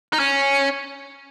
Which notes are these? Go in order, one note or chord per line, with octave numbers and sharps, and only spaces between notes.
D#4
C#4